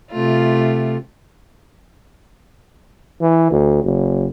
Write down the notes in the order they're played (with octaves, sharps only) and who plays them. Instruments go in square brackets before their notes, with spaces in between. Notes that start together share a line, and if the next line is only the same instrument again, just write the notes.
[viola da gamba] C3 A3 F4
[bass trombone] E3
D2
F#1